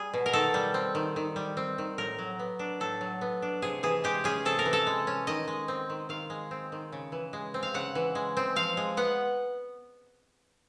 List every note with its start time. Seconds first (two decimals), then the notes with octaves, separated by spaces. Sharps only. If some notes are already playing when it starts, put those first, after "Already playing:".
Already playing: G3 G#4
0.13 B2
0.26 A#4
0.33 D#3 A4
0.54 G3
0.74 C4
0.95 D#3
1.16 D#3
1.36 G3
1.57 C4
1.78 D#3
1.98 A2 A#4
2.19 F#3
2.39 B3
2.59 D4
2.80 A2 A4
3.01 F#3
3.21 B3
3.42 D4
3.62 C3 G#4
3.83 E3 G#4
4.04 G#3 G4
4.24 C#4 G#4
4.45 C3 A4
4.59 A#4
4.65 E3
4.73 A4
4.87 G#3
5.07 C#4
5.27 D#3 D#5
5.48 G#3
5.68 C4
5.90 D#3
6.09 D#3 F5
6.30 G#3
6.51 C4
6.72 D#3
6.92 C#3
7.12 E3
7.33 G#3
7.54 C4
7.63 F5
7.74 C#3 F#5
7.95 E3
8.15 G#3
8.37 C4
8.56 F3 F5
8.77 G#3
8.97 B3 F#5